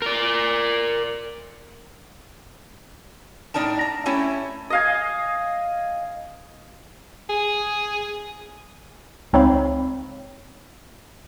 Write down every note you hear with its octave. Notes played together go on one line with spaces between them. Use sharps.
A#4 D5
A2 D4 D#4 A#4 A5
A#5
A3 C#4 E4 G4
D#5 F5 G#5
G#4
C#2 C4 D#4 C#5 F5 B5